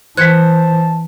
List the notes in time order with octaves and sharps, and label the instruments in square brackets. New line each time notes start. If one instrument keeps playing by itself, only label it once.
[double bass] E3 [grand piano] C5 B6 [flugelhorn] A5 [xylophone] F#6 G#6 C#7